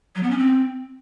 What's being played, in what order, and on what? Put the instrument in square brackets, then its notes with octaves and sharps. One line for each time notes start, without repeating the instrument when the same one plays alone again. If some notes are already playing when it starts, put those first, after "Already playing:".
[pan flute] F#3
B3
C#4
C4